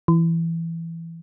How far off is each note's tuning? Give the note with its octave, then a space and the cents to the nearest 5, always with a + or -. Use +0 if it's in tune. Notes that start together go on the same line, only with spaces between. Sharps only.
E3 +10